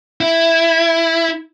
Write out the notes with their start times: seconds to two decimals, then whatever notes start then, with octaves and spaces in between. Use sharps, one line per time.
0.21 E4